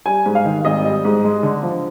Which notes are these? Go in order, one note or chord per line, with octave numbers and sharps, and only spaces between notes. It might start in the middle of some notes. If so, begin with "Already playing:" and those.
G3 G#5
G#2
F5
D#3
G#1 D#5
G3
G#2
G#3
D3
F3